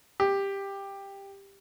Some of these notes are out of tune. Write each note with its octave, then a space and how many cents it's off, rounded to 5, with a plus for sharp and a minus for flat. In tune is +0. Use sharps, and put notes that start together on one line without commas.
G4 +10